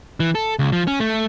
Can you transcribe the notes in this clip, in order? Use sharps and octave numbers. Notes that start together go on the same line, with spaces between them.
E3
A4
C#2
F3
C#4
A3